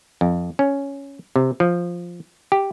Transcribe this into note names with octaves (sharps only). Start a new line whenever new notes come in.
F2
C#4
C3
F3
G4